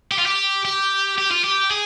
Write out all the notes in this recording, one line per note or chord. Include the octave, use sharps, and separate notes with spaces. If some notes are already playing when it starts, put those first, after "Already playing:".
G4
F4
G4
G4
G4
F4
G4
G#4